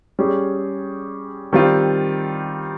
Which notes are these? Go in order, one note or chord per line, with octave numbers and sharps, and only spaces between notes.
G3 C#4 G#4
D#3 G3 C4 F4